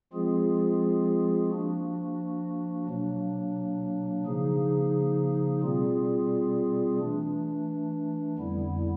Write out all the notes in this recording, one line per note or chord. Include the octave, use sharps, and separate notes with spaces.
F3 G#3 C4 F4 G#4
F3 A#3 D4 F#4
B2 F#3 A#3 D4
C#3 F3 A#3 D#4 G#4
B2 G3 C4 F4 G#4
E3 A3 D4
F2 D3 G3 B3 E4